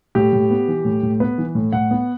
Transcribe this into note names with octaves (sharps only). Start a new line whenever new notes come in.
A2 G4
A2
B3
E3
A2
A2
B3 B4
E3
A2
A2 F#5
B3